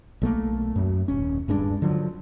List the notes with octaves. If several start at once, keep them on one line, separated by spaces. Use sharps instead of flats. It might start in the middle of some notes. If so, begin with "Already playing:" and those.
B1 A3 A#3
F#2
D#1 C#4
D1 G2 G#3 D4
D3 F3 F#3